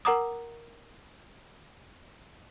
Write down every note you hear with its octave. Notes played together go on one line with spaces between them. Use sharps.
A#4 F#5 A#5 D6 D#6